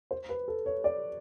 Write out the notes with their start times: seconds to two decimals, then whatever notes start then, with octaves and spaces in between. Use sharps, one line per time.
0.11 C5
0.29 B4
0.48 A4
0.66 C#5
0.84 D5